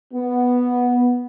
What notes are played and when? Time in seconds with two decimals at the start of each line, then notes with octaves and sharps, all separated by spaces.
0.13 B3